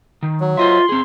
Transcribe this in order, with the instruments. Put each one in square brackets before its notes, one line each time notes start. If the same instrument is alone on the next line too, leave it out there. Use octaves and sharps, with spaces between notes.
[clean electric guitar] D#3
[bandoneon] F#3
[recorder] F4 [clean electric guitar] C5 D#5 E5 [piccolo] C6
[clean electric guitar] C4 G#4